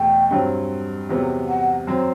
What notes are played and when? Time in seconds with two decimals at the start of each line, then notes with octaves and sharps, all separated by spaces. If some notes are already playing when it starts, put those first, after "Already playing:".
Already playing: E2 B2 A3 G5
0.31 G2 F#3 C4
1.10 E2 C3 F#3 B3
1.48 F#5
1.87 F#2 F#3 C4